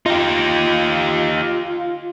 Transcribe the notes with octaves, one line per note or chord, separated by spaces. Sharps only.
D#4 F4 G4